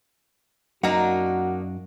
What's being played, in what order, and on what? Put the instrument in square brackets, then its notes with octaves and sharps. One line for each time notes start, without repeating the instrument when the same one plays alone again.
[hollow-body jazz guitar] F#2 F#5 [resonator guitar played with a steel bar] A#3 D4 D#4 [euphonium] F#4